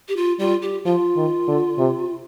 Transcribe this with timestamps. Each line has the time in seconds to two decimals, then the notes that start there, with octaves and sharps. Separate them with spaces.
0.08 G4
0.16 F4
0.39 G3 F4
0.62 G4
0.85 F3 F4
1.16 D#3
1.48 D3
1.78 C3